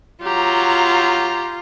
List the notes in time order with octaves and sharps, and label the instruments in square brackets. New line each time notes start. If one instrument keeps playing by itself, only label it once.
[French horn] F#3 [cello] F4 [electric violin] G4 A#5